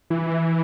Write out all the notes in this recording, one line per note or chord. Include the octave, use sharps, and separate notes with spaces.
E3